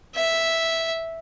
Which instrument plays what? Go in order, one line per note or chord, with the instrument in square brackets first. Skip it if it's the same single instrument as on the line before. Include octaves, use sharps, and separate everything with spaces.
[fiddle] E5